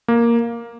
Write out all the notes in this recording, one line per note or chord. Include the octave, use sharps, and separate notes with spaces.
A#3